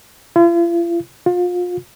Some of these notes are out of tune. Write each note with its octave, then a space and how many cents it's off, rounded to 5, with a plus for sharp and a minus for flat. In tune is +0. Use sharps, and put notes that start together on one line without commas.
F4 -45
F4 +30